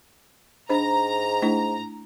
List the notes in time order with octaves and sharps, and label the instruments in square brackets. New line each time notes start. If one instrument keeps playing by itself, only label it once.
[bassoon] G#2 [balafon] D4 C5 [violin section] A#5
[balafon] A3 D4 E4